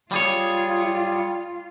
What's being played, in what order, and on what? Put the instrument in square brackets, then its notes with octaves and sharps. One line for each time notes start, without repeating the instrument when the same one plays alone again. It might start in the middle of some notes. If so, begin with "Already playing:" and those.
[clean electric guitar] G3 G#4 C#5 [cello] F4